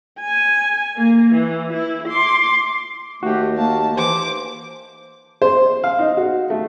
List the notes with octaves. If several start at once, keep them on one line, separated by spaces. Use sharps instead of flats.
G#5
A#3
E3
E4
C6 D6
D#2 A3 F#4 G4
A#3 A5
E3 C5 D6
C5
F5
D#4
F#4
A3